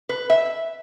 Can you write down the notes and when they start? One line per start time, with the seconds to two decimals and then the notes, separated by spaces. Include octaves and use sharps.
0.09 B4
0.30 E5